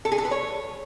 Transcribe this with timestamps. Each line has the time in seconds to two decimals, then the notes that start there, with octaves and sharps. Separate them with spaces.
0.05 A4
0.12 G#4
0.18 A4
0.25 B4
0.31 C#5